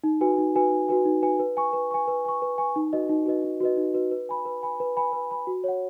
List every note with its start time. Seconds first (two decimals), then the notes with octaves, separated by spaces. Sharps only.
0.04 D#4
0.21 F#4 B4 G#5
0.38 D#4
0.55 F#4 B4 G#5
0.72 D#4
0.89 F#4 B4 G#5
1.05 D#4
1.22 F#4 B4 G#5
1.39 B4
1.57 G#5 C#6
1.73 B4
1.91 G#5 C#6
2.08 B4
2.25 G#5 C#6
2.42 B4
2.58 G#5 C#6
2.76 D#4
2.93 F#4 B4 D#5
3.09 D#4
3.26 F#4 B4 D#5
3.44 D#4
3.60 F#4 B4 D#5
3.77 D#4
3.94 F#4 B4 D#5
4.11 B4
4.29 G#5 B5
4.45 B4
4.63 G#5 B5
4.80 B4
4.97 G#5 B5
5.13 B4
5.31 G#5 B5
5.47 F#4
5.64 C#5 F#5